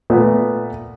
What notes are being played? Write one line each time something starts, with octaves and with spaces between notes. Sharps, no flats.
A#2 A3 B3